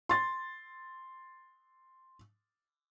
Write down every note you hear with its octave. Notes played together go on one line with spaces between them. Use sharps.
C6 A6